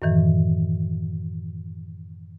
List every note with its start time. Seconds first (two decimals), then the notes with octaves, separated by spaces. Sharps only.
0.02 F#2 A2 D#3 E3